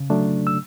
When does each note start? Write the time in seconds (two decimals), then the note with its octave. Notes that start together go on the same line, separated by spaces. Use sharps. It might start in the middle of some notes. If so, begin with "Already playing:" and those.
Already playing: C#3
0.10 F#3 A3 D4
0.47 E6